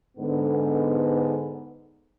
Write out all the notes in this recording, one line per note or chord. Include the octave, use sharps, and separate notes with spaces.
G#2 D3 B3